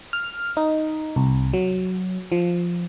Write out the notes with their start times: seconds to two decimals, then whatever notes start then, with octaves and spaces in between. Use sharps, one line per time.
0.13 F6
0.57 D#4
1.16 C2
1.53 F#3
2.32 F3